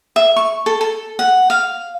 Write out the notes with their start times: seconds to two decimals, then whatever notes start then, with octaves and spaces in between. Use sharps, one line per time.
0.16 E5
0.36 C#6
0.66 A4
0.81 A4
1.19 F#5
1.50 F5